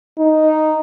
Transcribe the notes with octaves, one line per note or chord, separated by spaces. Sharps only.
D#4